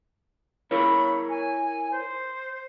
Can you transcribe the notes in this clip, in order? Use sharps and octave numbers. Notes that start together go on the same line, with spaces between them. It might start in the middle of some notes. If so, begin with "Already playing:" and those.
E4 A#4 C#5 B5
G#5
C5